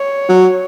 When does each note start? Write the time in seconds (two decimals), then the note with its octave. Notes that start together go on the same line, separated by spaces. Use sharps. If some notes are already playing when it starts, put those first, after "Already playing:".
Already playing: C#5
0.29 F#3